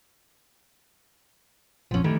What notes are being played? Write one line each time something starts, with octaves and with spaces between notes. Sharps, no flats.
A#1 F2 F3 C#4
D#3 E3 G3 A3